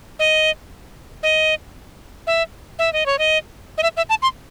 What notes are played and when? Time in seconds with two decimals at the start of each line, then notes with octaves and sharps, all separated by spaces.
0.19 D#5
1.23 D#5
2.27 E5
2.79 E5
2.93 D#5
3.06 C#5
3.19 D#5
3.78 D#5
3.83 E5
3.97 E5
4.10 A5
4.22 C6